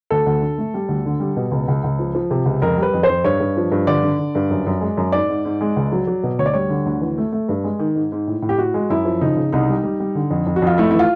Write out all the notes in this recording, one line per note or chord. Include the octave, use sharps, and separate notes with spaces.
D2 A4
D2
D3
A3
G3
D2
D3
G3
B2
C#2
C#2
C#2
F3
F3
C3
C#2
F2 A#4
G3
B4
F2
C5
F2
G2 C#5
G2
F3
G2
D3 D5
D3
D3
G2
F#2
F#2
G#3
F#2
G#2 D5
G#2
G#2
G#3
C#2
F#3
F#3
B2
D2 C#5
D5
G3 C#5
D3
D2
E3
A3
A3
G2
G#3
D#3
G#2
G#2
A2
A2
G4
A2 F#4
G#3
F#2 E4
F3
C#3 D#4
C#3
C2 D#4
G3
G3
G3
D3
F2
F2
F#4
F2 F4
A3 E4
E4
E3
F4